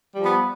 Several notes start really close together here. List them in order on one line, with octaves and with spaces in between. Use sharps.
G3 F3 B3